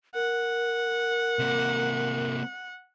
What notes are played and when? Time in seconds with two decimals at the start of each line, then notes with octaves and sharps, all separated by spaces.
0.15 A#4 F#5
1.39 C3 A#3